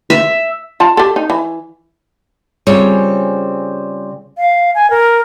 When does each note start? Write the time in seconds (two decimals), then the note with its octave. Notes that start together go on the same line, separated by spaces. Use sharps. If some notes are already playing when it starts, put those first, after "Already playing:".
0.10 E5
0.80 F4 A5
0.97 G4 A4
1.16 D#4
1.30 E3
2.67 C#3 G3 C4 F4 G#4 C#5
4.38 F5
4.75 G#5
4.90 A#4